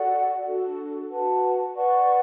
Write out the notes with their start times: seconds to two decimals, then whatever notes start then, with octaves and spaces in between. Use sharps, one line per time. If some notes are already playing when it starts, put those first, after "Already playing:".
Already playing: F#4 A4 D5 F#5
0.45 D4 F#4 A4
1.10 F#4 B4 F#5 A5
1.75 B4 D5 F#5 C#6